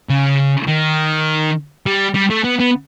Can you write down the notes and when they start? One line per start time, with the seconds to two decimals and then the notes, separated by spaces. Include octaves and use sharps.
0.09 C#3
0.68 D#3
1.86 G3
2.15 G3
2.30 A3
2.44 B3
2.60 B3